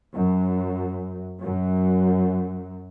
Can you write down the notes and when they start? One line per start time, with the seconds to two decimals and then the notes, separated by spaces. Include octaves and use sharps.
0.13 F#2
1.41 F#2